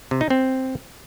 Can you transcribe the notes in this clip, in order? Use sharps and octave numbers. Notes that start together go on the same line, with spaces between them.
C3
D#4
C4